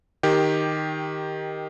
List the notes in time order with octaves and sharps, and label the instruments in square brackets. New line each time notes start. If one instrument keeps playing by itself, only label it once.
[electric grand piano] D#3 G4